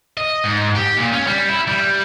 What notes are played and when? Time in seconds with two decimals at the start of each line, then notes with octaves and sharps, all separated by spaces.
0.18 D#5
0.44 G#2
0.75 G4
0.97 A#2
1.13 C#4
1.27 G3
1.49 E4
1.68 G3